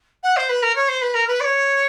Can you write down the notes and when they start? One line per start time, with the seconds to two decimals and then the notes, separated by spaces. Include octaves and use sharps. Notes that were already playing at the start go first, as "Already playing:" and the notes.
0.23 F#5
0.36 C5
0.49 B4
0.62 A#4
0.75 C#5
0.88 C5
1.02 B4
1.14 A#4
1.27 B4
1.40 D5
1.44 C#5